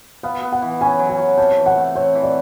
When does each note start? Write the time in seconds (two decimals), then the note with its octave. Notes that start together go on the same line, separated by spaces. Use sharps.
0.23 B3 F5
0.42 B3
0.52 F#5
0.62 E3
0.81 C#4 G#5
0.99 F#3
1.10 G#5
1.18 F#3
1.37 C3 A5
1.58 E3
1.66 F#5
1.76 A3
1.95 C4 C#5
2.15 E3
2.23 D5